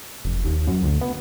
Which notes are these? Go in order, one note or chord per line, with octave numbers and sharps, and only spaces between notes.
F1
D#2
F#2
D2
B3